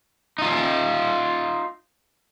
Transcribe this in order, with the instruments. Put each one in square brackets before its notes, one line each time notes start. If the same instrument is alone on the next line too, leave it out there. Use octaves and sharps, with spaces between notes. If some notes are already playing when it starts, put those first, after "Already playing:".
[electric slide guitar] D#4 F4